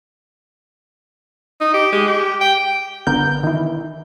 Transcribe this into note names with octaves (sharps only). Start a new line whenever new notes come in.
D#4
G4
G#3
G4
G5
G1 D3 B3 A#4 G6
D#3 E3